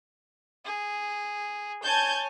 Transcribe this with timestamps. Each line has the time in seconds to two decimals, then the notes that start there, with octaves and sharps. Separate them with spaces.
0.64 G#4
1.83 C#5 G#5 A5 G6 G#6